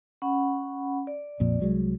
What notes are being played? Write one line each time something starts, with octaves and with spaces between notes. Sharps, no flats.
C#4 F#5 B5
D5
A#1 F2 A#2
C2 F#3 G#3